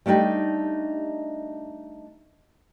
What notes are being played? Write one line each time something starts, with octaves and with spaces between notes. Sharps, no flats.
G3 A3 D4 D#4 G4